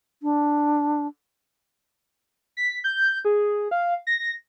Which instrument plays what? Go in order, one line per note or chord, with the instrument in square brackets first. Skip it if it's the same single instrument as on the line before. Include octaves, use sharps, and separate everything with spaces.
[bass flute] D4
[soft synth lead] B6
G6
G#4
F5
A#6